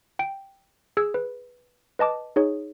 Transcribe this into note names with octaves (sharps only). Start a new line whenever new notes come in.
G5 D7
G#4 E6 G#6
B4
B4 D#5 A5 D6
D#4 G#4 C#5